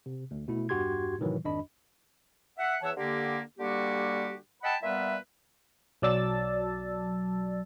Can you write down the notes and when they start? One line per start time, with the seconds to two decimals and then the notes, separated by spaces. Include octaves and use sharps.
0.06 C3
0.31 D2
0.48 B2 A3 E4
0.69 E2 G2 F#4 G4 C6 G#6
1.19 A2 C3 D#3 E3 F#3
1.44 G#1 F2 D4 D#5 B5
2.58 E5 F#5
2.82 E2 E3 C#5 E5 F#5 A5
2.97 D3 A#3 G4
3.59 D3 G3 A#3 F#4 G4
4.63 D#5 F#5 G5 A5 B5
4.82 A#2 G3 B3 B4 E5
6.02 B1 F#3 D5 A5 E6 A6